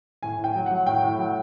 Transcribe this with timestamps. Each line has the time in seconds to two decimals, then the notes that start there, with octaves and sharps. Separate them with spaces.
0.23 A2 G#5
0.39 A2
0.44 G5
0.56 F#3
0.66 F#3 F#5
0.86 A2 G5
1.03 A2
1.19 F#3